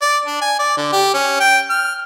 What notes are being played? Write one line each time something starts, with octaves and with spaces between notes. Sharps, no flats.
D5
D4
G#5
D5
D3
G4
C#4
G5
F6